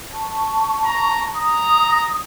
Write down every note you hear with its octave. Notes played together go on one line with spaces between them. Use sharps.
A5 C#6
A#5
A#5 D#6